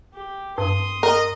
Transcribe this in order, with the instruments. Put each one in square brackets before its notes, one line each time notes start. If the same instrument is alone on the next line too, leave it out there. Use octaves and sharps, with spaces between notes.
[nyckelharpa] G4
[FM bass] G2 [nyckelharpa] C6 D#6
[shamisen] A#4 [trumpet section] D#5